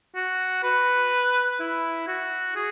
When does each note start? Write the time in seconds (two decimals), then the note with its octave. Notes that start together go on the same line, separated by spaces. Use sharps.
0.15 F#4
0.63 B4
1.60 E4
2.07 F#4
2.56 G#4